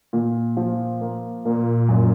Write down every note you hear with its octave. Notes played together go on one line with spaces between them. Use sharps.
A#2
F3
A#3
A#2 A#3
F#2